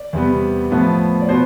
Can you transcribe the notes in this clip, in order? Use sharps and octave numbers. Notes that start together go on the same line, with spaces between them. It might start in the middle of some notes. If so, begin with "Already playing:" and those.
Already playing: D5
E2 C3 G3 B3
A2 F3 B3
D5
B2 B3 C5